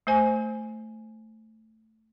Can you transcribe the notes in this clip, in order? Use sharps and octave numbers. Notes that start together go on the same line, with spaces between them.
A3 C5 G#5